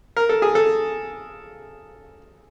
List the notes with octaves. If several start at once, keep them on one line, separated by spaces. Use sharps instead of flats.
A#4
A4
G#4
A4